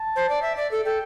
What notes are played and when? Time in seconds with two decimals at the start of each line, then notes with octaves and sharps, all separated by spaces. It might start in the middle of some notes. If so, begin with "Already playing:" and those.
Already playing: A5
0.16 C5
0.29 D5
0.42 E5
0.57 D5
0.71 A4
0.85 A4 G5